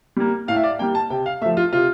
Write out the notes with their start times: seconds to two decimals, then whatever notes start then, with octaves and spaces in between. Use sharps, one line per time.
0.17 G3 A#3
0.48 A2 F5
0.56 E5
0.63 D5
0.79 G3 A#3 G5
0.95 A5
1.10 C3 G5
1.26 F5
1.41 A3 E5
1.46 F3
1.57 F4
1.72 C3 F4